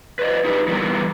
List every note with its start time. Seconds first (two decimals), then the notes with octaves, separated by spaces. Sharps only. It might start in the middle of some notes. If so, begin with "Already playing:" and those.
0.19 B4 D5 D#5
0.45 D#4 G4 B4
0.68 E3 G3 B3 A#4